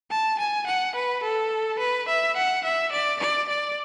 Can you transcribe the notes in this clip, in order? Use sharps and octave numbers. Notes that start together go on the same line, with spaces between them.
A5
G#5
F#5
B4
A4
B4
E5
F#5
E5
D5
D5
D5